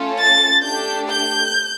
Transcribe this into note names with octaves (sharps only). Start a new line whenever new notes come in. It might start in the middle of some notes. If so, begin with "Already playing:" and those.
Already playing: A3 C#4 F4 A4
A6
A3 D4 G4 G6
G6